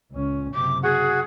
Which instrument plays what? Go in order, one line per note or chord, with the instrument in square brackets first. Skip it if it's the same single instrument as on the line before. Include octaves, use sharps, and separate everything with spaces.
[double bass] C#2 C#4
[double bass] F#1 C3 [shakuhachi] D6
[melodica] F#4 F#5 [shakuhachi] G#4